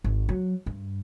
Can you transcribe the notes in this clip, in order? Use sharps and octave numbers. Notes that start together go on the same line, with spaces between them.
G#1
F#3
G2